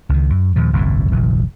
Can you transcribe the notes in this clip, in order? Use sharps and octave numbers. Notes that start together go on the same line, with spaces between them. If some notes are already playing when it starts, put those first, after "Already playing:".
C#2 D#3
F#2
D#2 A#2 F3
G1 C2 F2 A2
F1 A#1 A#2 D#3